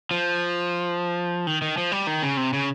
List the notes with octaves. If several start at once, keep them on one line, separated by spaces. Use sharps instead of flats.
F3
D#3
D#3
F3
G3
D#3
C#3
C3
C#3